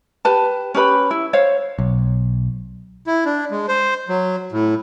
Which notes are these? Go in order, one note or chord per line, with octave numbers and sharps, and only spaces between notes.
G4 B4 A5
C#4 G4 B4 B5
E4
C5 C#5 F5
B1
E4
D4
G#3
C5
F#3
A2